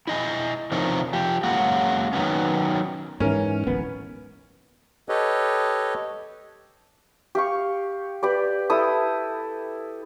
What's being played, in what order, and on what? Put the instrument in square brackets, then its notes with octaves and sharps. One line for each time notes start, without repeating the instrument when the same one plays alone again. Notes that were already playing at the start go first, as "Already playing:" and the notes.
[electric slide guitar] E4 D#5 G#5
C3 F3 D4 D#4 A#4 C#5
F3 G4
F#3 G#3 A#3 C#4 F#4
D#3 F#3 B3 C#4
[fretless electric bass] G#2 E3 [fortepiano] C#4 A#4
[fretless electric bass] D1 A1 B3
[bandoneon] G4 A4 B4 C#5 D#5
[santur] G4 F5 C#6
G4 B4 D5
E4 A4 D#6